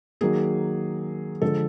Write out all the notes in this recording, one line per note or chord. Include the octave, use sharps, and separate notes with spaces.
D#3 F#3 A#3 G#4
D3 F3 G#3 A4